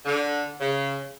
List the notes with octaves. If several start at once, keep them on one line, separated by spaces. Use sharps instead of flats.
D3
C#3